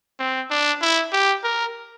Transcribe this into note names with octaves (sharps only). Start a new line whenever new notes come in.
C4
D4
E4
G4
A#4